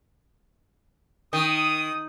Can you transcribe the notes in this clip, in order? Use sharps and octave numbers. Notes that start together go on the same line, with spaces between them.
D#3 D#6